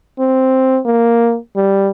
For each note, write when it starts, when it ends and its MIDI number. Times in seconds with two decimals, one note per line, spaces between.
0.19 0.80 60
0.86 1.37 58
1.56 1.91 55